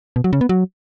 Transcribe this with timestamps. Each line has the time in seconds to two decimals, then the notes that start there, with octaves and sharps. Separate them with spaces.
0.16 B2
0.24 F#3
0.33 C#3
0.41 B3
0.49 F#3